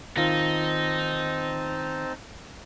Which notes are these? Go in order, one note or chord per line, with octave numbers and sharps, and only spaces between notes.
D#3 C4 D#4 F4 A5